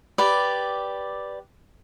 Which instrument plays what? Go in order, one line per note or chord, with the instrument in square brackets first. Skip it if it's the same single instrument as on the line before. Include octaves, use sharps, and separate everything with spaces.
[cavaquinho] G4 B4 D5